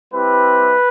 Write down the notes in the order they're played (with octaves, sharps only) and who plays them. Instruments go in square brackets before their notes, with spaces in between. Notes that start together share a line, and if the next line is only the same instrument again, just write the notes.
[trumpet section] G3 C4 E4 G4 B4